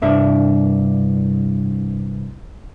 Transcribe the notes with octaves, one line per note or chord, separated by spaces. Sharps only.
C2 G2 D4 E5